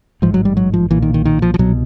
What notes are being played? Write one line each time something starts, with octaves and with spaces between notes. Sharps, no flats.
A1 G#2 F3
F#3
G3
F#3
F3
B1 A#2 E3
D#3
D#3
D#3
F3
F3
C2 B2 F#3